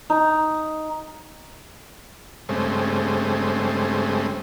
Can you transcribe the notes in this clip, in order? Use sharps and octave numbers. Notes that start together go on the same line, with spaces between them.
D#4
G2 C#3 G#3 A3 C4